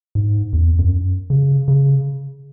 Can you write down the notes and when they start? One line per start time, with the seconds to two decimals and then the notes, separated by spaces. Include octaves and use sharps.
0.15 G#2
0.53 E2
0.79 F#2
1.30 C#3
1.68 C#3